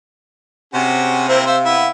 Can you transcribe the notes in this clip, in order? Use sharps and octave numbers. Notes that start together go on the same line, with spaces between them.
C3 C#4 F#4 G#4
A#3 C4 E4 C5
C5 E5 F5
B3 E4